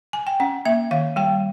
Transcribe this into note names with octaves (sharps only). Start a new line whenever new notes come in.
G#5
G5
C#4 F#5
A#3 E5
D#3 F5
G3 G5